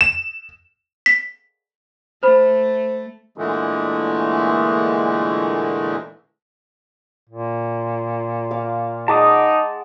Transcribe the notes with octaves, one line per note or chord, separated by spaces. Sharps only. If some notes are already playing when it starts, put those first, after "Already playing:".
E7
B6
A3 C5 B5
A#2 D3 E3 G#3 A3
A#2
F5 D6
G#3 D#4 F#5 A5 D6 D#6